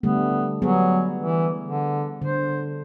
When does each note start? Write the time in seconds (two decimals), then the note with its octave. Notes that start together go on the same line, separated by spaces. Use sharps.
0.03 D3 G3 A3 B3
0.62 F#3 G3 B3 G#4
1.21 E3
1.64 D3
2.22 D3 C5